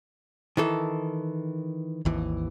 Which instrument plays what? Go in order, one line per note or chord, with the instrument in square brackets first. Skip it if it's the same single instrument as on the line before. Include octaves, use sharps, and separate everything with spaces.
[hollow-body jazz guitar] D#3 E3 A4
[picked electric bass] G#1 D#2 E3